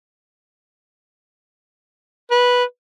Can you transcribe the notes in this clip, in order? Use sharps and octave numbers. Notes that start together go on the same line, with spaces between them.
B4